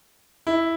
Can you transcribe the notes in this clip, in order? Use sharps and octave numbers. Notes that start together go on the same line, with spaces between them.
E4